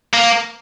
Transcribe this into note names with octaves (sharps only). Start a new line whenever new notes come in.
A#3